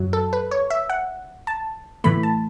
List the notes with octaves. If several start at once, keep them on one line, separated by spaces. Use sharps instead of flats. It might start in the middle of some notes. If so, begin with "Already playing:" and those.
Already playing: F#2 F#3
A4
B4
C#5
E5
F#5
A5
A2 E3 A3 B5
A5